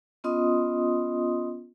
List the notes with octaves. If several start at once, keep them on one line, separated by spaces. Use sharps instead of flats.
B3 C#4 F4 D#5 C6 D#6